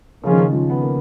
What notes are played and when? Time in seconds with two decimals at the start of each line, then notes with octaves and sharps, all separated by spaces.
0.24 C#3 F3 A#3 C#4 F4 G#4
0.32 D#3
0.39 C#3
0.53 F3
0.70 B3
0.82 A#3